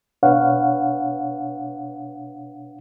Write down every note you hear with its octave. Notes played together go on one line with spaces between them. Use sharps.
B2 D4 B4 C#5 F5 F#5